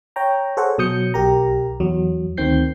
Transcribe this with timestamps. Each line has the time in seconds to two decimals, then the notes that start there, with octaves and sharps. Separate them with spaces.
0.16 C#5 G5 A#5
0.57 G#4 A4 C5 C#5 F#5
0.78 B2 F#3 D#6 G6 C#7
1.14 B1 G4 A#4 A#5
1.80 E2 F#3
2.37 D2 D#3 C4 G6 C7